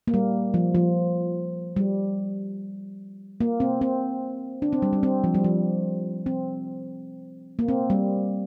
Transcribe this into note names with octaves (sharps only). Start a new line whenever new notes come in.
A#3
G3
F3
F3
G3
A#3
C4
C4
D4
C4
G3
G3
C4
F3
G3
F3
C4
A#3
C4
G3